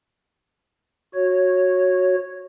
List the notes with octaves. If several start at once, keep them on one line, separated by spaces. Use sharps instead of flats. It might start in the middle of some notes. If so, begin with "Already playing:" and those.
F#4 C#5